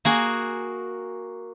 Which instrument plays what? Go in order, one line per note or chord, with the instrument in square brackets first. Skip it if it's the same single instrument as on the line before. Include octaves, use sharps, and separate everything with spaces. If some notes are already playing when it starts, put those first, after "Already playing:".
[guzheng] A#3 F#4 G#4